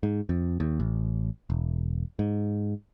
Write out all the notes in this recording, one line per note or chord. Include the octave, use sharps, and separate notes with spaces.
G#2
F2
D#2
A1
E1
G#2